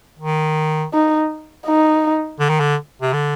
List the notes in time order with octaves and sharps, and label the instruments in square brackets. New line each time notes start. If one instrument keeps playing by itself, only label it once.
[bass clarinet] D#3
[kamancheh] D#4
D#4
[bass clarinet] D3
D#3
D3
C3
D3